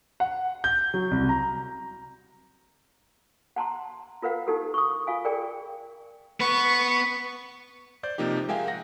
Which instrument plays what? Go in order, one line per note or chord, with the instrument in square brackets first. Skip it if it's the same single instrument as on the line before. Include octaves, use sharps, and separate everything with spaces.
[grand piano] F#5
G6
F#3
C2
A#5
[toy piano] F#5 A5 A#5 C6
F4 A#4 B4 F5 F#5
D#4 E4 G4 A4 A#4
C#6 D#6
F4 F5 G#5
G#4 A#4 D5 G5
[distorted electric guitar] B3 [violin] C#6
[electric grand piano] C5 D5 G6
C3 F3 A#3 D#4 G4
G#3 A#4 E5 F5 G5 G#5
F#5 A#6